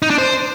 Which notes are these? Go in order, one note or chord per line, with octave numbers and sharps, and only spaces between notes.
D#4
D4
C5